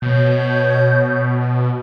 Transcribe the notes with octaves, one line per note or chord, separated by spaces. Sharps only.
B2 C#5 G6